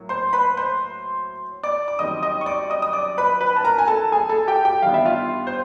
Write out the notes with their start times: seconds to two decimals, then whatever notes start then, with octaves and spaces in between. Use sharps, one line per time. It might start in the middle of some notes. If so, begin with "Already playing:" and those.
Already playing: A2 F#3 A#3
0.09 C5 C6
0.33 B4 B5
0.57 C5 C6
1.63 D5 D6
1.88 D6
1.99 F#2 D#3 G3 C4 D#5 D#6
2.23 D#5 D#6
2.41 C#6
2.46 D5 D6
2.70 D#5 D#6
2.82 D#6
2.93 D5 D6
3.18 B4 B5
3.41 B4 B5
3.56 A5
3.64 A#4 A#5
3.78 G#5
3.88 A4 A5
4.12 G#4 G#5
4.29 A4 A5
4.48 G4 G5
4.65 G4 G5
4.82 G2 D#3 G3 B3 F5
4.94 E5
5.06 F4 F5
5.47 C5